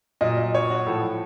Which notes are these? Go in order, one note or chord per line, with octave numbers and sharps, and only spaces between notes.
A#2 F#3 D#5
D#5
C#5
F#4
A2 F3 A4